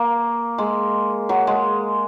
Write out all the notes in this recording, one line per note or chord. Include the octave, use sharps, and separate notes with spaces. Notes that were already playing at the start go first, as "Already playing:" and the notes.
Already playing: A#3
G#3
F#3
G#3